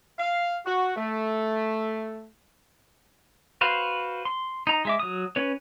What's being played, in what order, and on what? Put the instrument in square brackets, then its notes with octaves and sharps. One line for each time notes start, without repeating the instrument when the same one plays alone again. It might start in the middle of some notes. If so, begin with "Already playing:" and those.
[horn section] F5
F#4
A3
[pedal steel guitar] F#4 B4 C5 F5
C6
D#4 A#5
G#3 E5 D6
F#3 D#6
C#4 B4 C#5